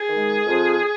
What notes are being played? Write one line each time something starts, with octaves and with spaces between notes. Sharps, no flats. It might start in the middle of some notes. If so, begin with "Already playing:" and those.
Already playing: G#4
D#3 G#3
F2